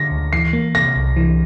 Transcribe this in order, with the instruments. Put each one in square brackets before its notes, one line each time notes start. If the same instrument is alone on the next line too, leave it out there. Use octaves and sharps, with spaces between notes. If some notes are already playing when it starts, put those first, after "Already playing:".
Already playing: [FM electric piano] D3 [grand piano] A#6
[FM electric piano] D2
[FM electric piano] E3 [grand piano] C7
[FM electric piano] A#3
[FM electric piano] C3 [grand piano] A#6
[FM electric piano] C2
E3